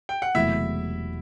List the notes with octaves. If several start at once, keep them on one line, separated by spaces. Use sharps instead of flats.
G5
F#5
E1 E2 C3 F#3 A3 E4 E5